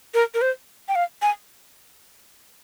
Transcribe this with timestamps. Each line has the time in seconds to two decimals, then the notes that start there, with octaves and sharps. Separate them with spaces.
0.14 A#4
0.34 A#4
0.42 C5
0.88 G5
0.95 F5
1.22 G#5